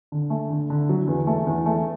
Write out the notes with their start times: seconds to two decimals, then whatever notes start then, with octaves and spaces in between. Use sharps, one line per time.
0.12 D3
0.30 A3
0.50 D3
0.70 D3
0.89 F#3
1.07 E2
1.27 A3
1.47 E2
1.66 A3